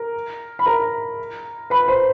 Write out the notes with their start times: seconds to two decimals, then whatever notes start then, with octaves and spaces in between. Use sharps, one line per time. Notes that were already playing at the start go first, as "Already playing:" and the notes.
Already playing: A#4
0.59 B5
0.66 A#4 A#5
1.70 B4 B5
1.88 C5 C6